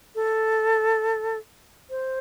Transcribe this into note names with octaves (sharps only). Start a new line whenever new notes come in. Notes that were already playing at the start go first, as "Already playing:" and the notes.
A4
C5